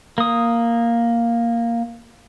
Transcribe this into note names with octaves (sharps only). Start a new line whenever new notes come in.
A#3 D#6